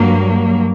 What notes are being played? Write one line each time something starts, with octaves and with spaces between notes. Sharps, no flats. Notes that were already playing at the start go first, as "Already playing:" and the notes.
Already playing: G2 F#3 A#3